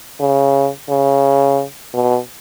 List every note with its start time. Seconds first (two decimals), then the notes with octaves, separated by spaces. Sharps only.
0.20 C#3
0.90 C#3
1.94 B2